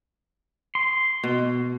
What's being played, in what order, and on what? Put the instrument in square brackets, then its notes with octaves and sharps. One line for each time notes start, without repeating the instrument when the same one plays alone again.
[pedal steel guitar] C6
[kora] B2